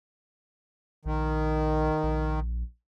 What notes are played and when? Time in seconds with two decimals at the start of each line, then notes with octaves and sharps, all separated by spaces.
1.05 A#1 D#3
2.03 A#1